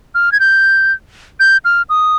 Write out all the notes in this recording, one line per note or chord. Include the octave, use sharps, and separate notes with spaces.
F6
G#6
G6
G6
F6
D#6